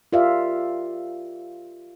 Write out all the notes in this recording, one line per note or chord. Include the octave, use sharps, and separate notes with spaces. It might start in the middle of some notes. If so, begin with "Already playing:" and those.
F4 G4 A#4 D5 E5 F5